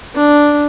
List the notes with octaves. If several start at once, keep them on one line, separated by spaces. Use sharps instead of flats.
D4